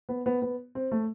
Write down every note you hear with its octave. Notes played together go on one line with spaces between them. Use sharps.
B3
B3
B3
C4
A3